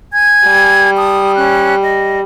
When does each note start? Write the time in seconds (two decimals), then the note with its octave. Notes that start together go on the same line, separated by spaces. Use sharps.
0.13 G#5 G#6
0.46 G3
0.97 A5 D#6
1.35 C#4 F#6
1.81 D#5